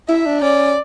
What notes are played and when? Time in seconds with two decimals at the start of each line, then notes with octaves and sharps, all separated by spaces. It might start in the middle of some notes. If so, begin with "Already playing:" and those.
0.09 E4 E5
0.26 D4
0.42 C#4 D5